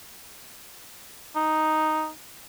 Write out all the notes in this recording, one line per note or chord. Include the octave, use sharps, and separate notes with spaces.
D#4